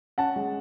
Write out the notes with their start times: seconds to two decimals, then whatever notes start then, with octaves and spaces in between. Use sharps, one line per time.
0.18 C#4 F#5 A5
0.36 G#3